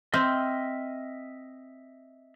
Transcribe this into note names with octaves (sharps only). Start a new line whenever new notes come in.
C4 D#5 E5 F6